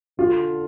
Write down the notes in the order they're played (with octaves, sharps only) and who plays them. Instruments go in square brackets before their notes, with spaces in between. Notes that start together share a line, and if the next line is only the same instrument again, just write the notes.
[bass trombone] D3 [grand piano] F4